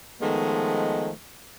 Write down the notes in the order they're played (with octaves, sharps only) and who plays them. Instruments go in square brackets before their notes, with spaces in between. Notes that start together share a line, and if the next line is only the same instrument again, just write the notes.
[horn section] D#3 F3 G#3 A3 B3